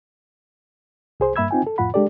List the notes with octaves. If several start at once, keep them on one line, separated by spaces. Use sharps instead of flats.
C2 G#4 C5
G2 A#3 E5 B5 E6 G#6
C4 D#4 F4 G5 G#5
A4
F2 A2 F4 F#5 B5
G#3 D4 G4 A4 D5